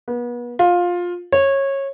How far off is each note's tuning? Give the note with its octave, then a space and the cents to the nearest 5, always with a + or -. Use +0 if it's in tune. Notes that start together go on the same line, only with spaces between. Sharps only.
B3 -35
F4 +15
C#5 -20